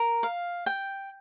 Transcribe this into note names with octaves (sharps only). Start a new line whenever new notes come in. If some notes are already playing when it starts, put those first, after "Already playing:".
Already playing: A#4
F5
G5